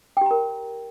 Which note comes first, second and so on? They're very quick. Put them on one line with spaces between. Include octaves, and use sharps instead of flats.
G5 G4 A#5 A#4